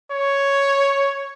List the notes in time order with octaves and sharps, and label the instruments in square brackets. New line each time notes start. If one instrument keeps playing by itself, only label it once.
[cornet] C#5